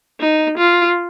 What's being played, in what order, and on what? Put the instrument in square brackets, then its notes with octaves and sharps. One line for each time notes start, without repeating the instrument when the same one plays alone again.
[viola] D#4
F4